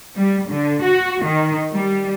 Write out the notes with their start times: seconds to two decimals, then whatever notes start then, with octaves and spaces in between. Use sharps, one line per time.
0.16 G3
0.49 D3
0.82 F#4
1.24 D#3
1.72 G3